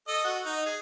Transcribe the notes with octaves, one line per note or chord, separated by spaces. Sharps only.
A4 D#5
F#4
D#4
G#4